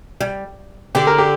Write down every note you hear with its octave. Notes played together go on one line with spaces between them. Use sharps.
G3
D3 G4
A#4
G4